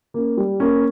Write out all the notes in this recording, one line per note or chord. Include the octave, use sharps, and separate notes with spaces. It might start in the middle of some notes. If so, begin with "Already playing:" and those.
A#3 C#4
G3
A#3 C#4